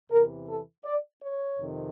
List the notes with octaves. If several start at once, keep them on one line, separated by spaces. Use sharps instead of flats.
E2 C3 E3 A#4
A4
D5
C#5
F2 C3 D#3